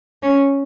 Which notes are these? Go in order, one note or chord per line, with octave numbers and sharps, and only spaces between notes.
C#4